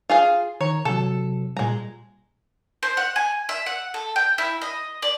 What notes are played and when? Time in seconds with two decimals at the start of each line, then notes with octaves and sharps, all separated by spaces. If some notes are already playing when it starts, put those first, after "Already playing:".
0.10 F4 G#4 F5
0.61 D#3 C#5 A#5
0.85 C3 F#3 A4
1.57 A#2 G3 G#3 A#5
2.83 C5
2.97 F#5
3.16 G#5
3.49 E5
3.66 F#5
3.94 A4
4.16 G5
4.38 E4
4.62 D#5
5.02 D5